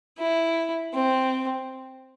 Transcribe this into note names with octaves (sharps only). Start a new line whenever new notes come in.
E4
C4